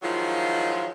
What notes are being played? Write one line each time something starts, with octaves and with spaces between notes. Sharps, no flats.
D#3 F3 F#3 G#3 E4 F4